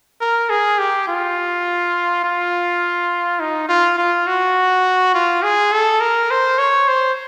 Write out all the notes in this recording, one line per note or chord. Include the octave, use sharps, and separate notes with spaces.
A#4
G#4
G4
F4
F4
D#4
F4
F4
F#4
F4
G#4
A4
A#4
C5
C#5
C5